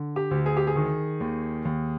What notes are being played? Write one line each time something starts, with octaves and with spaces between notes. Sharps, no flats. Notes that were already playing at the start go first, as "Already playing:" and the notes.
Already playing: D3
G4
D2
G#4
G4
G#4
D#3
D#2
D#2